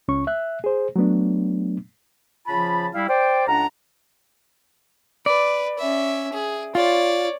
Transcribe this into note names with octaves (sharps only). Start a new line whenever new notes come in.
C#2 C#4 C#6
E5 F#6
G#4 C5
F#3 A3 B3 D4
C#3 F3 F4 A5 B5
G3 E4 F5
C5 D5 G5
C#2 D4 F#5 A#5
B4 D5
C#4 E5
G#4
F4 C#5 D5